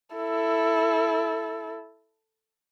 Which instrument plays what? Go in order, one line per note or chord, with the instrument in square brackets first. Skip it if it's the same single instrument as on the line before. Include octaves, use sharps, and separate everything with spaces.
[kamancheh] E4 A4